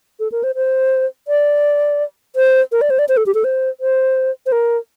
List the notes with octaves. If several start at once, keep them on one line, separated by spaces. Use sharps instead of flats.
A4
A#4
C5
C5
D5
C5
A#4
D5
C5
D5
C5
A4
G4
A4
C5
C5
C5
A#4